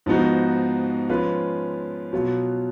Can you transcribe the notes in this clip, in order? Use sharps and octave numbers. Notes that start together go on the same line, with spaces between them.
G#2 F3 B3 D#4 F#4
F3 G#3 C#4 F4 B4
B2 F#3 B3 F4